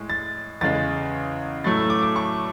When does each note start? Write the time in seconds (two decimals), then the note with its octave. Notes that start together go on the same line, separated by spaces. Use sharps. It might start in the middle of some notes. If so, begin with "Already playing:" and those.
Already playing: A2 G#3
0.10 A6
0.61 E2 C#3 G#3 A6
1.64 A2 F#3 A3 A6
1.77 E6
1.90 D6
2.03 D6
2.16 C#6